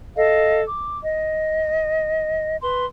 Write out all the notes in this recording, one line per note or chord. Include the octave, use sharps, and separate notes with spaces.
A4 D#5 F5
D6
D#5
B4 C6